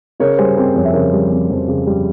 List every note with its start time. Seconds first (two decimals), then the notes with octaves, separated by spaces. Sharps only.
0.20 C#3 A#4 C#5
0.38 G3 G#4 C5
0.57 C4 G4 A#4
0.75 F2 C#5
0.85 E5
0.93 C#3 A#4 C#5
1.13 G3
1.31 C4
1.50 F2
1.68 C#3
1.87 G3